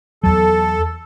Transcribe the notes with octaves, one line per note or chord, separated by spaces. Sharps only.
E2 F#3 A4